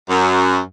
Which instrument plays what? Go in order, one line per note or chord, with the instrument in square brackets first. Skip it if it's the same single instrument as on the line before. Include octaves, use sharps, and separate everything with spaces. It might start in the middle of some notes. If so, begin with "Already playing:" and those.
[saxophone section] F#2